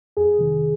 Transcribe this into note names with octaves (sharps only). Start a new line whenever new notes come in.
F2 G#4
C3 D#3